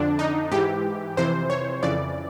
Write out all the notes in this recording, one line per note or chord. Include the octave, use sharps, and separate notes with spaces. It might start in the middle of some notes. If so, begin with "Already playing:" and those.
Already playing: F2 D3 D4
D#4
G#2 E3 G4
F2 C3 E3 C5
C#5
F2 C#3 E3 D5